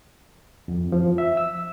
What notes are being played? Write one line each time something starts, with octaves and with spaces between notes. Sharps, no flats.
F2
F3
E5
E6